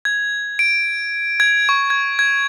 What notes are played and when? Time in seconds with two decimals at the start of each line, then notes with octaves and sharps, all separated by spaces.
0.05 G#6
0.59 D7
1.40 G#6
1.69 C#6
1.90 G#6
2.19 G#6